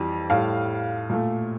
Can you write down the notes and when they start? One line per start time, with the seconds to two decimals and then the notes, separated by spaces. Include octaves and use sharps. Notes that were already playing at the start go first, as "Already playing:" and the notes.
Already playing: F2 E3 G3
0.30 A2 G3 F5
1.10 A#2 A3